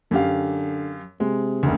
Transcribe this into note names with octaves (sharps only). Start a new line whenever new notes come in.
F#2 D3 G4 F5
C3 G#3
F#1 D2